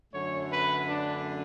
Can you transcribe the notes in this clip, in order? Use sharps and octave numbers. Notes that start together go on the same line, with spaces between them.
F#2 D3 A3 C#5
B4
D4